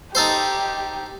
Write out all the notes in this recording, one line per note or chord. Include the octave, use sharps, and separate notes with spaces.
D#4 G4 A4 C5